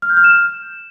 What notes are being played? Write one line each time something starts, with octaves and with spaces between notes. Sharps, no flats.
F6
G6
F6
E7